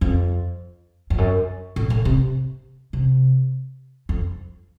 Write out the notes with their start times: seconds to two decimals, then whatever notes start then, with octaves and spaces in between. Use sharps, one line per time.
0.01 F2
1.10 F2
1.18 F#2
1.76 A2
1.90 A2
2.05 C3
2.93 C3
4.09 F2